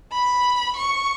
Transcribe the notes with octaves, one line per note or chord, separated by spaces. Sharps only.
B5
C#6